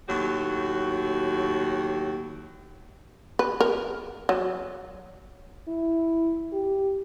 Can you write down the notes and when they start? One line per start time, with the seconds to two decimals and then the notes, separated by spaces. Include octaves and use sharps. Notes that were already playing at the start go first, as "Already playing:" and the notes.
0.08 D#2 A2 F#3 F#4 G4
3.39 B4
3.61 A#4
4.29 F#3
5.68 E4
6.53 G4